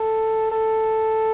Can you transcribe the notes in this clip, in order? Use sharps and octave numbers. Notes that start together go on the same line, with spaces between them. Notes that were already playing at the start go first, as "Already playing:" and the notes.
Already playing: A4
A4